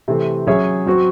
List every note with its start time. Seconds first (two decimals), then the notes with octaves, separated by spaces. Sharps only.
0.08 C3 E3 A3 C4
0.47 F#3 C#4 G#4 C#5 E5
0.86 F#3 C4 F#4